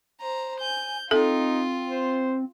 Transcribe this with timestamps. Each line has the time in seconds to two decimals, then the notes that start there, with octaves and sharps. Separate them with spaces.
0.21 C5 A#5
0.61 G#5 G6
1.11 C4 D#4 F4 A4
1.89 C5